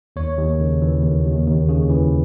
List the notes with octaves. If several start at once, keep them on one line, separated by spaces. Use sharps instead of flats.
D#2 C#5
D#2
C#3
E3
D#2
D#2
D#2
C#3
E3